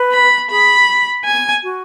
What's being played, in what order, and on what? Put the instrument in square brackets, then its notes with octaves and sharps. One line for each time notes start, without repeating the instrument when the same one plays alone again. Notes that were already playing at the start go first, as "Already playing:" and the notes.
Already playing: [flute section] B4
[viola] B5
[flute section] G#4 [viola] B5
[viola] G#5
[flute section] F#4